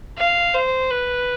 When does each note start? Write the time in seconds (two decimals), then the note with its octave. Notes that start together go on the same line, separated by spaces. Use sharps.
0.18 F5
0.54 C5
0.91 B4